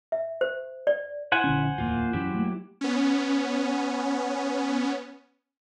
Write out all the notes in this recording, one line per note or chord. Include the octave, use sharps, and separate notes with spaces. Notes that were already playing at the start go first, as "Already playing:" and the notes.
E5
C5
D5
E4 C5 F#5 G#5
A#1 D3 C#4
D1 E2 A#3 F4
F#2 E3 F#3 C#4 E4 G4
A3 A#3
B3 C#4